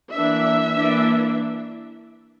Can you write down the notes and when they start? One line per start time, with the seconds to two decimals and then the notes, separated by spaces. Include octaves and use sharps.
0.15 E3 A#3 D4 E5
0.77 E3 A#3 D4